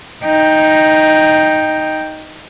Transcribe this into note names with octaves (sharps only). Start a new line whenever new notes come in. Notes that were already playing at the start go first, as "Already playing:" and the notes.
D#4 G5